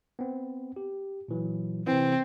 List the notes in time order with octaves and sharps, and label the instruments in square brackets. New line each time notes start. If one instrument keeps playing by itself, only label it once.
[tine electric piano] B3 C4
G4
A#2 E3 F#3
[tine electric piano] C3 E3 [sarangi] C4